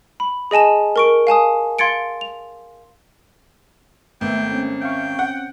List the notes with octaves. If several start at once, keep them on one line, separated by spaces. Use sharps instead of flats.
B5
G#4 D#5 G#5 A5 E7
A#4 C#6 D7
F5 G#5 A5 D#6
F5 C6 G#6 A6 C#7 D7
F7
G#1 A3 B3 E5 G5
C4 C#4
E5 F5 G5 C#6
F#5